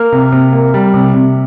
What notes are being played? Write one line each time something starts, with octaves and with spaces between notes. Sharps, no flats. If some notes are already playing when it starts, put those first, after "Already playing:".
Already playing: A#3 F6
C3
C3
A#3
G3
C3
C3